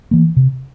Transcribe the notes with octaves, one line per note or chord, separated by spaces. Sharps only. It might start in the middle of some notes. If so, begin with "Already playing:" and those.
E3 A#3
C3